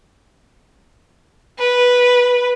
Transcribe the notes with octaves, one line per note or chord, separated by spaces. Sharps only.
B4